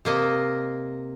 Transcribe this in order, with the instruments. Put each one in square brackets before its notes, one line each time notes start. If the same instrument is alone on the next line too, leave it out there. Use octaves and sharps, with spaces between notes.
[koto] C3 A#3 D#5